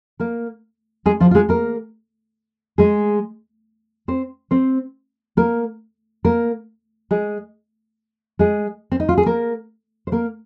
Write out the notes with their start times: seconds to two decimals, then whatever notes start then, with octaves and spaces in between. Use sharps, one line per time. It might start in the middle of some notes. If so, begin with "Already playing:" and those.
0.20 A#3 A#4
1.06 G#3 G#4
1.20 F3 F4
1.31 F4
1.35 G#3 G#4
1.49 A#3 A#4
2.78 G#3 G#4
4.08 C4 C5
4.51 C4 C5
5.37 A#3 A#4
6.25 A#3 A#4
7.11 G#3 G#4
8.39 G#3 G#4
8.92 C4
9.00 D#4
9.09 F4
9.18 G#4
9.26 A#3 A#4
10.07 C5
10.12 A#3 A#4